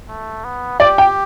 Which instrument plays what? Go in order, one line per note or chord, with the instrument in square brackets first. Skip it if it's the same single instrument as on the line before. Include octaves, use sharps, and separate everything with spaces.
[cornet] A3
B3
[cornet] G4 [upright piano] D5
[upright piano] G5